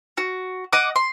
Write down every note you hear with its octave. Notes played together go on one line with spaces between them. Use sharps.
F#4
D#5 F#5 D6 D#6
C6